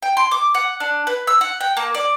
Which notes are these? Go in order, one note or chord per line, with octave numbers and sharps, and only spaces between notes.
G5
C6
D6
F#5
D4
B4
E6
F#5
G5
A#3
D5